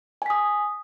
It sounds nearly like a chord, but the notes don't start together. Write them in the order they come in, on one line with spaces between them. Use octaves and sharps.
G#5 B6 D#6